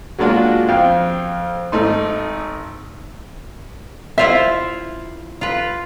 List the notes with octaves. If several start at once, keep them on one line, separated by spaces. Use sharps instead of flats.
F#3 G#3 A#3 D4 F4 F#4
F2 F5 G5
G#1 A3 D#4 C6
E4 F4 C5 E5
F4 B4